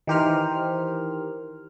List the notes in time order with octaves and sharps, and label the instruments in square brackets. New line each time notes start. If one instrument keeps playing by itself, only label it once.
[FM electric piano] D#3 E3 G4 A#4 C5 F6